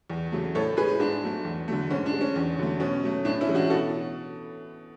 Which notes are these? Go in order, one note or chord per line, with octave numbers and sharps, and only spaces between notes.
E2
C#3 F#3 A3
A2 A4 C#5
G#3 G#4 B4
G#2 D4
F#3 A3
E2
D3 F#3 A3
G#2 C#4
D4
G#3
C#4
E2
D3 F#3 A3
B2 C#4
F#3 A3
A2 D4
C#4 E4
E3 G#3
D4 F#4
B2 F#4 A4